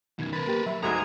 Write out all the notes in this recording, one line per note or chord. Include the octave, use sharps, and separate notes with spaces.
F#2 B2 D#3 G#6
A#4 B4 A6
A#3 G4 A6
F#3 E5 B5
D2 G#2 G#3 F#4 A4 A#5 D#6 G#6